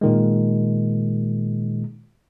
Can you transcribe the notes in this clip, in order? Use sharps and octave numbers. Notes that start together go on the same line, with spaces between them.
A#2 D#3 G#3